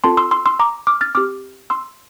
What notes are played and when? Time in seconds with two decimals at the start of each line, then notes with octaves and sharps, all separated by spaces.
0.04 C4 F4 A4 A5 C6
0.17 C6 E6
0.31 C6 E6
0.46 C6 E6
0.59 A#5 D6
0.87 D6 F6
1.01 F6 A6
1.15 C4 G4 D6 F6
1.70 C6 E6